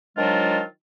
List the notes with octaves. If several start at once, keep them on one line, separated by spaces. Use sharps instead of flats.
D#3 F3 F#3 G#3 D4 F4